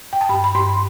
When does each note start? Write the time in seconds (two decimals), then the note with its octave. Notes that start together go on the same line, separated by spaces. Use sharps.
0.13 G5
0.21 A5
0.29 G2 B5
0.44 B5
0.55 G2 C6